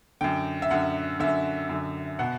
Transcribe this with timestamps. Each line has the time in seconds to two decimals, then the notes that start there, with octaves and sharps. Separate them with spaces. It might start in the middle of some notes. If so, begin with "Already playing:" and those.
0.21 F#2 D3 G5
0.62 E5
0.71 F#2 D3 F#5
1.20 F#2 D3 E5
1.69 F#2 D3
2.19 B2 F#5